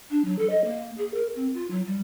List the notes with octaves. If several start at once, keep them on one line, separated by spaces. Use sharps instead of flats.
D4
F#3
A4
D#5
A#3
G#4
A#4
C4
F4
F#3
G3